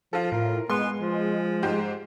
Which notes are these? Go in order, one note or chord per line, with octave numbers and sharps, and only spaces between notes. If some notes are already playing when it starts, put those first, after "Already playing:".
F3 F4 A4
A2 F4 A#4
G#3 B3 C6
F3
G#2 G4 C5